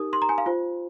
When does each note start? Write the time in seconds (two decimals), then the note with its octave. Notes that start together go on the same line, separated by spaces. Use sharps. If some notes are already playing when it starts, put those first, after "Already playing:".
Already playing: D#4 G4 A#4 D#6
0.13 C6
0.22 A#5
0.29 G#5
0.38 F5
0.46 F4 C5